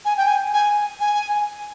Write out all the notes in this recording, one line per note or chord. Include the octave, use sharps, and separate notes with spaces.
G#5
G5
G#5
G#5
G#5